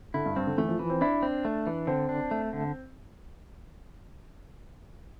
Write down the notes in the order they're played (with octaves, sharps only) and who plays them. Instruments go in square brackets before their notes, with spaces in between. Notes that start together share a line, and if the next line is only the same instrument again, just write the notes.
[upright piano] D3 [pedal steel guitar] E4
[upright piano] G2
[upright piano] G2 [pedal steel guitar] C4
[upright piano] D3
[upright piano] E3 [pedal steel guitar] A3
[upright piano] F3
[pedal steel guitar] E3 [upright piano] F3
[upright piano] C4
[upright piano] D4 [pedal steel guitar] E4
[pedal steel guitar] C4
A3
E3
[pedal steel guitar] D3 [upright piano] C4
[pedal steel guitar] D4
A3
D3